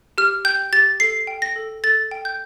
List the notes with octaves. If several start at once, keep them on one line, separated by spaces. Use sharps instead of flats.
G4 F6
G5 G6
G4 A6
A4 C7
G5
A#6
A4
A4 A6
G5
G6